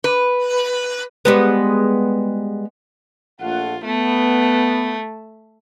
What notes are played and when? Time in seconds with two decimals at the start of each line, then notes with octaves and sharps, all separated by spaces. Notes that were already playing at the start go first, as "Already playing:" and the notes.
0.04 B4
1.25 G3 G#3 B3
3.40 A#1 A3 F4 F#5
3.85 A3 B3